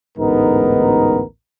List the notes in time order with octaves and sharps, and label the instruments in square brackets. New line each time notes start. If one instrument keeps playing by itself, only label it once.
[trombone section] A1 D2 G#2 B3 D#4 A#4